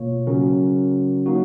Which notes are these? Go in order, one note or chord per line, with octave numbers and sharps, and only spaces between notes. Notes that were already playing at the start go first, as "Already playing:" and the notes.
Already playing: B2 A#3 F4 C#5
C#3 F#3 C#4 F#4 A#4
F#3 A#3 D#4 F#4